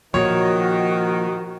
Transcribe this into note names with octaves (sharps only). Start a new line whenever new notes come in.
A#2 D#3 F3 F#4 C#5